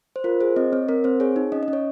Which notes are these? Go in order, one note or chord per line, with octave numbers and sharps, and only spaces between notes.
C5
F4 A#4
G#4 C5
C4 D#5
C4 C#5
C4 A#4
C4 C5
G#4 C#5
D#4
C#4 D#5
D#5
C#4
C#5